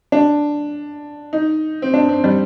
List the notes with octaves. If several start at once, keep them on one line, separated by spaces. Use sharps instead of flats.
D4
D#4
C4
D4
C4
G3